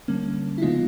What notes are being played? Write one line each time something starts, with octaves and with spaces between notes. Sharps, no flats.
D3 G3 A#3 C#4
E4
C#3 F3 G#3 B3 D#4 F4